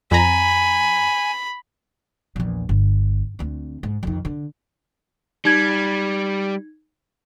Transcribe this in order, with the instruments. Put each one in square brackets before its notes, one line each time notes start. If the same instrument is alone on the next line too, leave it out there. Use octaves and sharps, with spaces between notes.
[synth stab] F2 A#5 [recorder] G#5 [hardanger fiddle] B5
[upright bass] A#1 E2
G1
D2 C4
G#2
F2 D#3
D3
[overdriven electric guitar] G3 [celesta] D#4 G#6